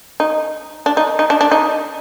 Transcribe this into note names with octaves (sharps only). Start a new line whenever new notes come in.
D#4
D4
D#4
D#4
D4
D4
D#4